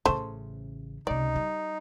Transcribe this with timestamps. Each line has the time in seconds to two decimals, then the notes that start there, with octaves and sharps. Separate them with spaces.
0.06 A1 C#3 A3 C5
1.07 C#2 C3 D#4 D5
1.36 G3